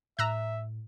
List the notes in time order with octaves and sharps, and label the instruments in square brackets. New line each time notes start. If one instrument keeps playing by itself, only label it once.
[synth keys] A2 [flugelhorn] E5 [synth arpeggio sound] A#5 E6 F#6